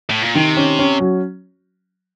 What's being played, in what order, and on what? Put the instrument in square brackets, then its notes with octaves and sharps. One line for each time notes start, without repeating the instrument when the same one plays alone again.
[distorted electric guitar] A2
A#2
[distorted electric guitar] C3 [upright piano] D#3
[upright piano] C#4
C#4
F#3